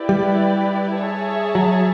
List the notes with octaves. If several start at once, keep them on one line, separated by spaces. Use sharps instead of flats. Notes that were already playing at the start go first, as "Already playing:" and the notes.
Already playing: E4 G4 B4 D5
G3
G#4 C#5 E5 A5
F#3